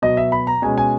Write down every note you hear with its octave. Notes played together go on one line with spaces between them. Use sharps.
B2 F#3 B3 D#5
E5
B5
A#5
B2 G#3 C#4 G#5
G#5